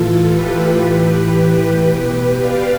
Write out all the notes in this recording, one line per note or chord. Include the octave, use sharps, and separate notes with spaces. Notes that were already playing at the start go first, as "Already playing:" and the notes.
Already playing: A2 E3 F4 A4
G4 B4
A2 E3
B2 G4 B4
D5 F5